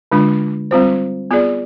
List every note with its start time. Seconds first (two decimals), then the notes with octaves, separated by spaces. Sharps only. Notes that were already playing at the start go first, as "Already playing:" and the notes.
0.12 D3 G#3 D4 F4
0.71 G3 C4 F4 C5
1.31 B3 F4 G#4 D5